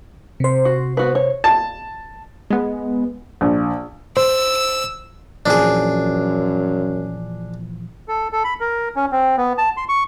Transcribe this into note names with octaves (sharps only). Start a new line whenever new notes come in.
C3 C5
F#4
B3 F#4 B4
C#5
A5
G#3 B3
A#1
C5 E6
F#2 A#2 E3 F3 D4 G#4
A4
A4
B5
A#4
C#4
C4
B3
A5
C6
C#6